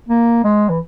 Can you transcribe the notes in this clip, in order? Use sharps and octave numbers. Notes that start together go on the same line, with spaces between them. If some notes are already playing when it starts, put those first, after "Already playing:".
A#3
G#3
E3